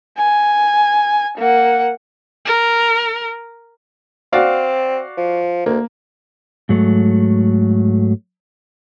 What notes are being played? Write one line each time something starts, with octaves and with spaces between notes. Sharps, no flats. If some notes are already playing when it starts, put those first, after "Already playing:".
G#5
A#3 F#5
A#4
C4 F#4 D5 F5
F3
D2 A#3
G#2 F#3 A3